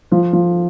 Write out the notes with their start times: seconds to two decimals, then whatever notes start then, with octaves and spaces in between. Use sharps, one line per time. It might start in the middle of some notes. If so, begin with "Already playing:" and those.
0.12 F3
0.33 F3